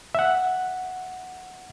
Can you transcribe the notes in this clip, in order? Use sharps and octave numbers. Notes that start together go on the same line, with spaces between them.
E5 F#5